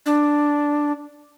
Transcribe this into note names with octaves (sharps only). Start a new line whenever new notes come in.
D4